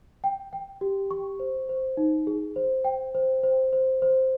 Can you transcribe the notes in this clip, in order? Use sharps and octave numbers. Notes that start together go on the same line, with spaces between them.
G5
G5
G4
C#6
C5
C5
D#4
G#4
C5
G5
C5
C5
C5
C5